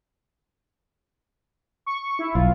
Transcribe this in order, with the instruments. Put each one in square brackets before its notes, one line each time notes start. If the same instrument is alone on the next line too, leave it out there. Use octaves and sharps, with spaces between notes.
[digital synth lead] C#6
E4
[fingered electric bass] B1 [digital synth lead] F4